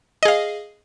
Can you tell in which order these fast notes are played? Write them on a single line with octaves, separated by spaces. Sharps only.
D#5 G#4 F5